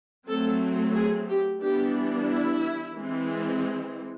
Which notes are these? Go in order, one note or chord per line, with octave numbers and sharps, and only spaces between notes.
F#3 A3 C4 A4
G#4
G4
E3 G3 B3 D4 G4
E4
E3 G#3 C4